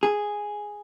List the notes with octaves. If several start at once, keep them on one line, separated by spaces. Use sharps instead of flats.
G#4